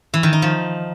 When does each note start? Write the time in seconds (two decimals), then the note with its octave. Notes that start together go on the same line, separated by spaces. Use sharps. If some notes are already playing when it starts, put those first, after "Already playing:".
0.14 E3
0.23 D#3
0.33 D#4
0.42 F3